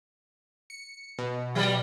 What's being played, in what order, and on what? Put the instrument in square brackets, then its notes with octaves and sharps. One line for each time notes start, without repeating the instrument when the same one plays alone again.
[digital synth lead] C#7
B2
[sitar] F#3 G3 D5